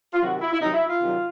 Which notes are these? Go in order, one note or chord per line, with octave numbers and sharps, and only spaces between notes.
F4
C3 D#3 F#3 F#4
E4
E4
C3 D#3 F#3 D#4
E4
F4
C3 D#3 F#3